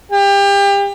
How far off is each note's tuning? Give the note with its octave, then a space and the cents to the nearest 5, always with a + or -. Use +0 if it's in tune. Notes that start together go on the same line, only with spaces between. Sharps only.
G4 +30